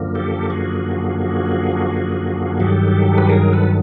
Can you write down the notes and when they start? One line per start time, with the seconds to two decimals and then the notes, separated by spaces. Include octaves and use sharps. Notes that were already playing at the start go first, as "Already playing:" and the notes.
Already playing: F#2 D3 F3 A#3
0.15 G4 A4
0.50 F#4 G#4
2.60 G2 D#3 F#3 G4 A4
3.18 B4
3.29 G#4 A#4
3.53 A4 B4